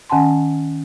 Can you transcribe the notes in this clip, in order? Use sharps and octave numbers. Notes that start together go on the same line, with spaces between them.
D#3 C#4 F#5 G#5 A5 C6